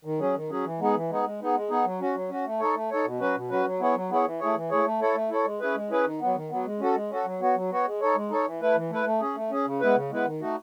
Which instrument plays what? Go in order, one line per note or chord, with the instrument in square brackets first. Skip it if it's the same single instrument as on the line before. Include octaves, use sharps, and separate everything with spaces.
[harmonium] D#3
F#3 C#4 G#4
D#3
F#3 C#4 G#4
E3
G#3 B3 D#4 G#4
E3
G#3 B3 D#4 G#4
G#3
B3 D#4 G#4
G#3
B3 D#4 G#4
F#3
C#4 F#4
F#3
C#4 F#4
A3
D#4 A4 C#5
A3
D#4 A4 C#5
B2
F#3 C#4 F#4 B4
B2
F#3 C#4 F#4 B4
F#3
B3 E4 G#4 C#5
F#3
B3 E4 G#4 C#5
E3
A3 E4 G#4 C#5
E3
A3 E4 G#4 C#5
A3
E4 A4 C#5
A3
E4 A4 C#5
G#3
C#4 E4 G#4 B4
G#3
C#4 E4 G#4 B4
D#3
F#3 B3
D#3
F#3 B3
G#3
C#4 F#4 A4
G#3
C#4 F#4 A4
F#3
B3 F#4 C#5
F#3
B3 F#4 C#5
G#3
D#4 A4 C#5
G#3
D#4 A4 C#5
E3
A3 E4 B4
E3
A3 E4 B4
A3
C#4 G#4
A3
C#4 G#4
C#3
G#3 B3 E4 B4
C#3
G#3 B3 E4 B4
D#3
A3 D#4 F#4